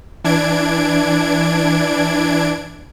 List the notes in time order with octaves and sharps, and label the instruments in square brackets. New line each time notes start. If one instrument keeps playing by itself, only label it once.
[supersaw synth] E3 D4 G#6 D7